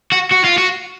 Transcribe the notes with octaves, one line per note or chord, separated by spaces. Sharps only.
F#4
F#4
F4
F#4